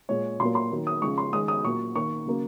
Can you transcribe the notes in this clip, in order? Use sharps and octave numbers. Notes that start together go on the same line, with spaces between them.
A#2 G#3 C#5
A#2 F#3 A#3 C6
C6
D#3 F#3 A#3
D#6
C#3 F3 G#3 C#6
C6
D#3 G#3 D#6
D#6
A#2 F#3 A#3 C#6
D#3 A#3 C#6
C#3 F#3 A#3